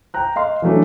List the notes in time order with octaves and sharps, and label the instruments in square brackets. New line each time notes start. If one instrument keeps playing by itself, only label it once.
[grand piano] G5 A#5 F#6
D#5 F5 C6
E3 F#3 A3 D4